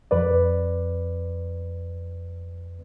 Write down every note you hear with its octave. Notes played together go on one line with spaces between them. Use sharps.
F2 B4 D5